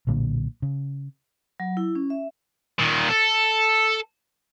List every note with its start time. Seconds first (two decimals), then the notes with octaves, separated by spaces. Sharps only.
0.07 B1 A#2 D3 A#3
0.62 C#3
1.60 F#3
1.77 E4
1.95 C#4
2.10 E5
2.79 A#2 D#3
3.09 A4